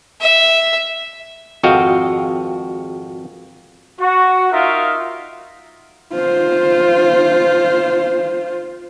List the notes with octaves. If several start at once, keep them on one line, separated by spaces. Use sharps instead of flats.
E5
G#1 F2 F#4 D#5 F5 G5
F#4
D#4 F4 F#4 A#4 E5 F5
F4 C5